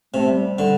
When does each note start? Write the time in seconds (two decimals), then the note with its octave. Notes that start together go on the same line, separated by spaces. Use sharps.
0.14 C3 A3
0.29 G3
0.44 G3
0.58 D3